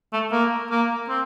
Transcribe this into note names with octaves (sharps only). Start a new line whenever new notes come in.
A3
A#3
A#3
C4